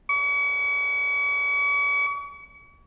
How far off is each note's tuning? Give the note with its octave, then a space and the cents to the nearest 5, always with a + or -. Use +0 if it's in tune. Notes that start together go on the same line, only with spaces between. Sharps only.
C#6 +45